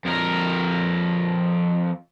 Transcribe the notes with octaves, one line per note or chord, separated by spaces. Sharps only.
F2 A#4